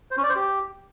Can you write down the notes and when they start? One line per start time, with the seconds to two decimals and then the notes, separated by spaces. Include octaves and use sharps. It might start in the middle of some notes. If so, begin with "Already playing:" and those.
0.11 C5
0.17 C#4
0.23 D5
0.29 C5
0.36 G4